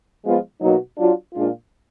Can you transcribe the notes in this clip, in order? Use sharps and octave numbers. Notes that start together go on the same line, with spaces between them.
F3 G#3 B3 F4
B2 F#3 A#3 D#4 F#4
F#3 D4 F4
A#2 G#3 D4 F4